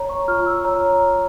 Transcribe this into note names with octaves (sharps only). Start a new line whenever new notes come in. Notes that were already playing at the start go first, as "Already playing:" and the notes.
Already playing: C#5 A#5
C#6
F4 F6
E6
C#5 A#5